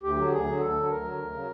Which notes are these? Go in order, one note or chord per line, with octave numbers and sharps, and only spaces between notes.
D2 G4
D3 F#3
D2 G#4
D3 F#3
D2 A4
D3 F#3
D2 A#4
D3 F#3
D2
C#3 F#3